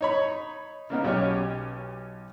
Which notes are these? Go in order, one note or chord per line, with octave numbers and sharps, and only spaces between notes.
D#4 C#5 B5
C#3 A#3 B3 D#4
B1 C#4 G4 C#5 F6